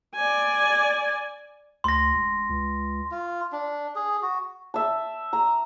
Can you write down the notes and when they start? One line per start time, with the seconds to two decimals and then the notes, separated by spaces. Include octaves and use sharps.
0.16 D5 G#5
1.84 D2 C6 A#6
2.14 E1
2.49 C#2
3.11 F4
3.53 D4
3.96 G#4
4.22 F#4
4.74 E5 A5
5.33 A#5